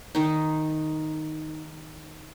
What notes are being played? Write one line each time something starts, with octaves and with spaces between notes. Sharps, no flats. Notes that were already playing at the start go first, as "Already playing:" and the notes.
D#3 D#4